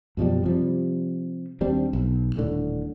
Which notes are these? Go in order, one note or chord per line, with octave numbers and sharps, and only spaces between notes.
F#2 B2 F3 G3
C3 F3 G3
D#2 G3 C4 D4
B1
D#1 A2 D3